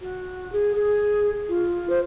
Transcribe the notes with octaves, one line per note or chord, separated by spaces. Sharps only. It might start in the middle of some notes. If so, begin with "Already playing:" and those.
F#4
G#4
G#4
F4
C5